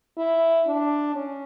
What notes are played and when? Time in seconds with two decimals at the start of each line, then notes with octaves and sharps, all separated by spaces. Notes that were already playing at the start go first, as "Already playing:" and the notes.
0.18 E4
0.67 D4
1.15 C#4